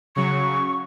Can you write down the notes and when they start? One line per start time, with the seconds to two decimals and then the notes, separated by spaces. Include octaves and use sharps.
0.16 C#3 F#3 C#6